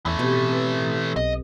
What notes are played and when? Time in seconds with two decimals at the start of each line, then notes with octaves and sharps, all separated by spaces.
0.06 E2 E3 A3
0.19 B2 C4 G4
0.49 C4 A4 B4
1.16 B1 D#5